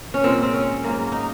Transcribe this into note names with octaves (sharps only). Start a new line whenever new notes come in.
C#4
A#2 G#3 C4
C4
C#4
G#2 F#3 A#3
D#4